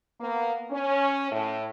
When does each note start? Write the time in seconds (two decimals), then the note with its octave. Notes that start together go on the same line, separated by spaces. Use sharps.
0.21 A#3 B3
0.71 C#4
1.32 A2